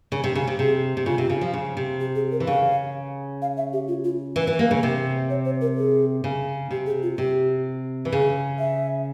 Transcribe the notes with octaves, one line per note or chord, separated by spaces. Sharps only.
C#3
C3
C#3
C3
C3 G#4
C3
C#3 F4
C3
C#3
F3
C#3
C3
G4
G#4
A#4
E3
C#3 F5
F5
E5
G4
F4
F4
E3
E3
A#3
C#3
C3
C#5
C5
A#4
G#4
C#3
C3 G4
G#4
F4
C3 G4
E3
C#3 G#4
E5